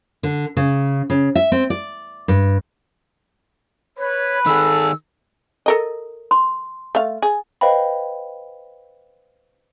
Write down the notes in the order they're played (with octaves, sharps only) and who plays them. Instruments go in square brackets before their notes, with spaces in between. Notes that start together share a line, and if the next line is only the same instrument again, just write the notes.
[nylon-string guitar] D3
C#3
C#3
E5
C4
D5
G2
[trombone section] B4 [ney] C#5
[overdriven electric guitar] D#3 G#4 [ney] A4 [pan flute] E6
[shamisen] A4 A#4 D#5
[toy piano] C6
[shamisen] A3 F5
G#4
[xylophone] B4 C5 D#5 F5 G5 B5